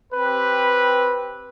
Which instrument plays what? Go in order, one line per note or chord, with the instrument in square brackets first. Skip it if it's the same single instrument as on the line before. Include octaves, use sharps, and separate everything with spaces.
[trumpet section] C4 G4 B4